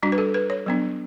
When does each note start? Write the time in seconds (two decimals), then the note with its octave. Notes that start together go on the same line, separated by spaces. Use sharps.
0.02 G3 D4 F#4
0.12 B4
0.18 A4
0.34 B4
0.50 C#5
0.66 F#3 B3 D4